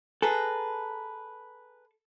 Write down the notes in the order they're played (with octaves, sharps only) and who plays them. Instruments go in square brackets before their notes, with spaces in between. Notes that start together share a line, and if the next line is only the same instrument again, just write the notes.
[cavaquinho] G#4 B4 A#5 [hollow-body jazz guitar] A4